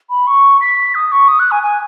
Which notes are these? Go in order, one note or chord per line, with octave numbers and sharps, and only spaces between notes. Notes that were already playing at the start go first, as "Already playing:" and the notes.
B5
C#6
B6
D#6
C#6
D#6
F#6
G#5
G#5